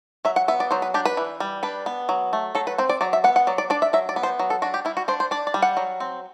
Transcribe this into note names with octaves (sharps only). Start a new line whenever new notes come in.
F#3 E5
F#5
B3 E5
D5
F#3 C5
B4
D4 G4
B4
E3
G3
D4 B4
B3
F#3
A3
F#3 A4
B4
C4 C5
D5
F#3 D5
E5
B3 F#5
F#5
F#3 D5
D5
D4 D5
E5
F#3 E5
D5
B3
C5
F#3
A4
D4 F#4
G4
G3 E4
F#4
D4 C5
C5
D4 D5
D5
G3
F#5
F#3
C4